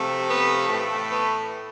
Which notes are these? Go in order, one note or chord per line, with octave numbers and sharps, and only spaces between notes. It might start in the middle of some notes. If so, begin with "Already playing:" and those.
Already playing: C3 F3 A3
B3
A2 E3 A3
B3